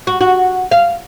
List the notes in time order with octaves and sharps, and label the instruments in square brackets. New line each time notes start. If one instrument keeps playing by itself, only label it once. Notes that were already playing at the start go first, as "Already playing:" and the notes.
[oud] F#4
F#4
F5